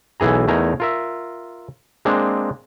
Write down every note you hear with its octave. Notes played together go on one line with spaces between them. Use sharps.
B1 E3 G#4 A#5
E2 A3 D#4 A#4 G#5 A#5
F4 A#4 E5
G#3 A#3 C4 D4